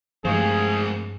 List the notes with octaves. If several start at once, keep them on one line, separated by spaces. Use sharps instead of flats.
G2 F3 G#3 A3 C4 G#4 C#6 D7